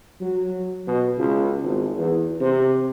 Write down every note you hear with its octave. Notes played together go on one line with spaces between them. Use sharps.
F#3
B2
C#2
G#1
E2
C3